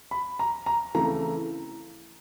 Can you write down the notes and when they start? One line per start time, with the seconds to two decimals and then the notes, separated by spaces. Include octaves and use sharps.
0.11 B5
0.39 A#5
0.66 A#5
0.95 C#3 E3 A3 C4 A#5